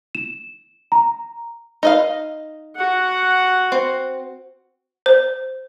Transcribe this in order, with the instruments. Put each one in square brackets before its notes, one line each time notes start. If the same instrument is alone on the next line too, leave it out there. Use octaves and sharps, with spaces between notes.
[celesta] E7
A#5
[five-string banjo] D#4 D#5 F5
[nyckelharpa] F#4 F#5
[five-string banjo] C4
[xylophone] C5